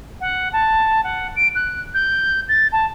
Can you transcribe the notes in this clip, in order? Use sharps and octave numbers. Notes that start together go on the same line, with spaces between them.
F#5
A5
F#5
D7
F#6
G6
A6
A5